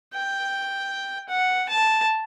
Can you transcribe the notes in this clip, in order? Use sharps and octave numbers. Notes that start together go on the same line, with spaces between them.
G5
F#5
A5